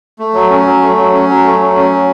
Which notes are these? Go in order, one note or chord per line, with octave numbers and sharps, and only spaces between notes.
A3
F#3
C#4
F#3
A3
F#3
C#4
F#3
A3
F#3
C#4
F#3